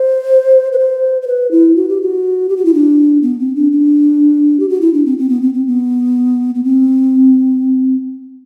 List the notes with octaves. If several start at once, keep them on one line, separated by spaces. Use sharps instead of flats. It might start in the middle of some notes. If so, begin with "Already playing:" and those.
Already playing: C5
B4
C5
C5
B4
E4
F#4
G4
F#4
G4
F#4
E4
D4
B3
C4
D4
D4
G4
F#4
E4
D4
C4
C4
B3
C4
C4
B3
B3
C4